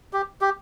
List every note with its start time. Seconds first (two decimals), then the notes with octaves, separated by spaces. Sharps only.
0.13 G4
0.41 G4